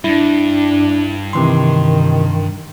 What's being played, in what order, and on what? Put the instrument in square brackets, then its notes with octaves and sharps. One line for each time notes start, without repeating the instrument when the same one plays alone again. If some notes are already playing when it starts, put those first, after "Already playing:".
[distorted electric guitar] G2 [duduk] D4 [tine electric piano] E4
[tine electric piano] C3 E3 C6 [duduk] D#3